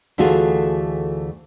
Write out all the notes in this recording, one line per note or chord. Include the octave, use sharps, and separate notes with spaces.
D2 E3 A3 F4 F#4 G#4